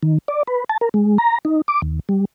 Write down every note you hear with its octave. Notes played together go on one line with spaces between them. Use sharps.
D#3
D5
B4
A5
A#4
G#3
A#5
D#4
D6
D#2
G3